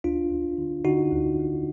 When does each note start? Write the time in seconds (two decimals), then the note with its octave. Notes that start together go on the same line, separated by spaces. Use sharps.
0.04 D2 D4 F4
0.31 D2
0.58 D3
0.85 D3 D#4 F#4
1.12 D2
1.39 D2